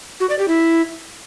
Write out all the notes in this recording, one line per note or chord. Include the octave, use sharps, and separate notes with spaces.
F#4
D5
G4
E4